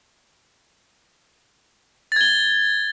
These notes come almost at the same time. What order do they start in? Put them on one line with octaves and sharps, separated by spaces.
A6 G#6 G7